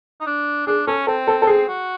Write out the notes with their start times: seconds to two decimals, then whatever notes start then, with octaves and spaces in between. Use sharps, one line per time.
0.20 D#4
0.26 D4
0.67 D4 G#4
0.87 C#4 A4
1.07 C4 A4
1.27 A4
1.42 A4
1.47 C4 G#4
1.68 F#4